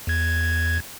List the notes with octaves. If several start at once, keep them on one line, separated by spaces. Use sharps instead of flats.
E2 G#6